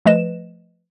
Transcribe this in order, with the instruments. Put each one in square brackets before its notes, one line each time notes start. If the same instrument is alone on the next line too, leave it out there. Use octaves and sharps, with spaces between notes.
[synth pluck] F3 A3 B4 D#5 E7